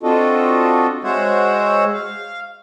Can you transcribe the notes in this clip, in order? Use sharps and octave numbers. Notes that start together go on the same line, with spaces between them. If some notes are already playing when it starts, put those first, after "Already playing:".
C4 D4 F4 F#4 A4 D#5
G#3 F#4 C5 C#5 E5 F#5
F5